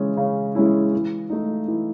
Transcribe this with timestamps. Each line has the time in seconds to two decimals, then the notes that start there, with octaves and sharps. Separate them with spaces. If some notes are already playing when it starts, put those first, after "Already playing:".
Already playing: C#3 E3 G#3 C#4 E4
0.17 C#3
0.55 E3 G#3 C#4 E4
0.93 E3
1.30 A3 D#4
1.68 E3